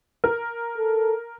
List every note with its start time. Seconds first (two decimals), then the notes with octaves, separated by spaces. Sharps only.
0.24 A#4
0.78 A4